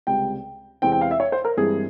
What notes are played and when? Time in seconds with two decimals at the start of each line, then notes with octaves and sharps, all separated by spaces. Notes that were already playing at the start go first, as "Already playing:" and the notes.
0.07 C#2 C3 G3 G5
0.82 E2 C3 E3 G#3 C4 G5
0.92 G5
1.01 F5
1.11 E5
1.20 C#5
1.32 C5
1.45 A#4
1.57 G2 E3 G#3 C4 G#4